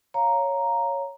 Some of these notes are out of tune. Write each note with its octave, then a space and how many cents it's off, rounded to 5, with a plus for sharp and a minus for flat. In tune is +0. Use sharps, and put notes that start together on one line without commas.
C#5 +0 F5 +0 A#5 +0